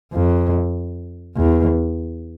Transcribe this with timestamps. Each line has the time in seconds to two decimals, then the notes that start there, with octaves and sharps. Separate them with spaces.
0.14 F2
1.37 E2